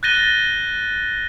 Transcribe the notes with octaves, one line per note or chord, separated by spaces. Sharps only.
F#6 G6 A6 A#6 D#7 G7